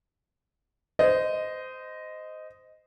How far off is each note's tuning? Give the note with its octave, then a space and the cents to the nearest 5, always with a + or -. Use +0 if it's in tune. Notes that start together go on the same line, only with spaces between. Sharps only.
C5 -20 D#5 +0